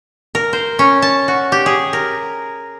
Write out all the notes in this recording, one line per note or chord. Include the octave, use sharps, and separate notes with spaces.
A#4
C5
C#4
A5
F#4
G4
G#4
A#4